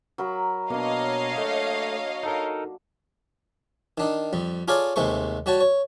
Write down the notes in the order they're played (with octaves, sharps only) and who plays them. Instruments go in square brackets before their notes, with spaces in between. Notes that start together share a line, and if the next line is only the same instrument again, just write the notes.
[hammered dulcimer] F#3 A#4 B5
[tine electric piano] B2 [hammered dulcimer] A#3 D4 [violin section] C#5 D#5 F5
[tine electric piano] A3
D#4 A4 A#4
[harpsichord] D#3 D4 D#4
F2 G3
F4 G#4 A4 C#5 D5 F5
D#2 C3 G#3 A3 C5 C#6
G3 F#4 C#5 A5
C#5